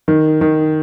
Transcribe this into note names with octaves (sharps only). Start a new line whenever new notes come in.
D#3
D#3